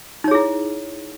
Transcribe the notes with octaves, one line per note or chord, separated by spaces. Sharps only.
D#4 E4 G#4 C#5